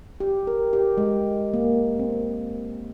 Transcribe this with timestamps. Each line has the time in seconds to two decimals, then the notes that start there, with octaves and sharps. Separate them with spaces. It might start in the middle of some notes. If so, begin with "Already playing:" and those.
0.20 G4
0.47 A#4
0.73 G4
0.98 G#3
1.54 A#3
1.99 C4